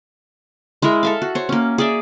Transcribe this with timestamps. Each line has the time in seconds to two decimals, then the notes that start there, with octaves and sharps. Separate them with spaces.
0.82 G#3 E4 A#4 E5
1.03 A4 E5 F5
1.22 F#4
1.35 C5 C#5
1.49 A#3 C#4
1.78 G#4 D5 E5